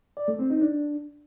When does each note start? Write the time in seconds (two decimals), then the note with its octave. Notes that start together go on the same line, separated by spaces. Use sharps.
0.17 D5
0.28 A3
0.39 C4
0.50 D#4
0.61 D4